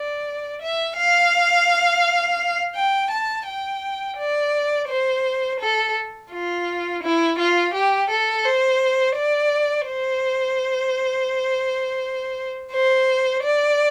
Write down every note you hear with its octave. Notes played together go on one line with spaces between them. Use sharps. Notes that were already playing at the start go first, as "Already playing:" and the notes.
Already playing: D5
E5
F5
G5
A5
G5
D5
C5
A4
F4
E4
F4
G4
A4
C5
D5
C5
C5
D5